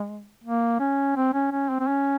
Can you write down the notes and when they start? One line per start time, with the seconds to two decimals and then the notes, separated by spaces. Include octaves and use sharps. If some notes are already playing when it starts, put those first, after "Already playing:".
Already playing: G#3
0.44 A#3
0.80 C#4
1.16 C4
1.34 C#4
1.52 C#4
1.69 C4
1.80 C4
1.88 C#4